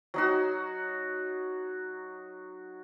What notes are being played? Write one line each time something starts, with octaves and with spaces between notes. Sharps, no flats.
F#3 D#4 F#4